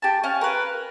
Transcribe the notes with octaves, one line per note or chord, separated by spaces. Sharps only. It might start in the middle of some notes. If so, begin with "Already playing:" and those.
G4 A5
C#4 F5
A#4 B4